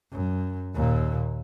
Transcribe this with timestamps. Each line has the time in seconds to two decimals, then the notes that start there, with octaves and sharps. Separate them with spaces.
0.11 F#2
0.74 D#2 A#2